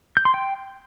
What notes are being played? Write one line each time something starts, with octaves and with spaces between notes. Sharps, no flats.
G6
C6
G5